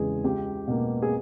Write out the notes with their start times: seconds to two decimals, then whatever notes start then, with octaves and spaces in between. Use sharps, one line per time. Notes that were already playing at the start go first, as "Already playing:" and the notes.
Already playing: E2 C#3 G#3 G#4
0.24 C#2 G4
0.67 B2 A#3
1.02 G#4